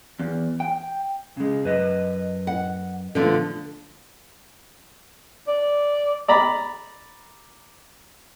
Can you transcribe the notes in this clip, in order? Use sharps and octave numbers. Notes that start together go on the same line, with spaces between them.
E2
G5
C#3 G#3
F#2 B4 D#5
F#5
A#2 D3 F3 A3 B3
D5
D5 A#5 B5